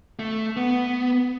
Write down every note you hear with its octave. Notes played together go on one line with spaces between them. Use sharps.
A3
B3